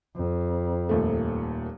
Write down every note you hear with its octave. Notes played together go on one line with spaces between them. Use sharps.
F2
D#1 D#2 A3